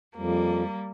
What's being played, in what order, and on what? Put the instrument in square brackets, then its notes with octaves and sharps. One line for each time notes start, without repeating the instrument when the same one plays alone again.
[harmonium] F2 [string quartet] G3 A#3